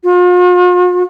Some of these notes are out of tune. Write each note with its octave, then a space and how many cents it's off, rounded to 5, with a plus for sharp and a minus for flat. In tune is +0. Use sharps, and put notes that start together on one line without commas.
F4 +45